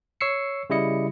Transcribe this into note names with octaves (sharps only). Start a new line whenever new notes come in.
C#5 C#6 E6 C7 C#7
C#3 G3 E4 D#5 C#7